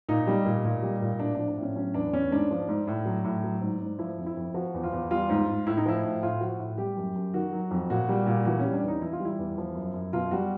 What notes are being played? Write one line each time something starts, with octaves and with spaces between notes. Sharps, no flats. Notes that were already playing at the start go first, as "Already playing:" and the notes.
A#2 D#4
G3
A#2
A#2
G3
A#2
A2 D4
F3 D4
D4
A2 C#4
F#3 C#4
E2 D4
E2 C#4
G#2 D4
F3
G#2
A2
F#3
A2
F#3
G#2
G#2
F3 E4
F2
E4
F2
F3 F#4
E2
F4
E2
G3 F4
G#2
G#2
A2 E4
D#4
F3 E4
A2
A2 F4
F3 F#4
A2
G3 G4
F#2
F#2
D#3 F#4
F#3
F2
A#2 F#4
G3
A#2
E3 F#4
C#4
G3
D4
E2
D#4
E3 E4
F4
G3 E4
E2
F3
F#2
F#2
B2 F4
G3 F#4